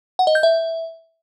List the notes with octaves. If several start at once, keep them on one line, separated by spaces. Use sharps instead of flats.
F#5
D#5
G6
E5